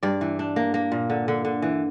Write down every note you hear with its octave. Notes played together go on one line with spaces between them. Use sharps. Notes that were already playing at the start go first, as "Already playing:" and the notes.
G2 D5
E3
D4
A#3
A#3
A#2
D3
D3
D3
E3